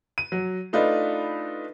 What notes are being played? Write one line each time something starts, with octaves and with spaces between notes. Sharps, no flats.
D#7
F#3
A3 D4 D#4 F4 B4